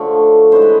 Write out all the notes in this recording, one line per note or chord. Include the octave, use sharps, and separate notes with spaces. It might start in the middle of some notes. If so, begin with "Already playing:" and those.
Already playing: D3 F3 A3 C#5
E3 G#3 C#4 E4 C5
B4